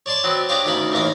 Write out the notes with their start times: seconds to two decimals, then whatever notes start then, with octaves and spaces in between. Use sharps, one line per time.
0.06 C#5 D5 A5 C6 C#6
0.24 F#3 B3 C4
0.49 D4 G4 C#5 D#5 F5 C#6
0.65 D2 D#3 C#4 F5 B5
0.92 A1 D#2 E3 A#3 F5 A#5